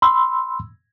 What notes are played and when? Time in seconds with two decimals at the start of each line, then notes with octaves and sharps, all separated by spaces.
0.02 B5 C6 E6